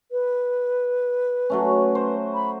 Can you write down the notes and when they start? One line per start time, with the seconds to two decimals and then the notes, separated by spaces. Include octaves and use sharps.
0.12 B4
1.50 F#3 A3 C#4
1.95 C5
2.34 B5